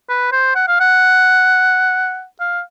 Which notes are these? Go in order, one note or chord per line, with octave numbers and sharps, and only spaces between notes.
B4
C5
F#5
F5
F#5
F5